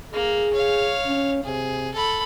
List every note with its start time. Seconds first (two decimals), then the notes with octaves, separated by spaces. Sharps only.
0.14 A#3 G#4
0.54 C#5 F5
1.06 C#4
1.44 C3 G#4
1.94 A4 B5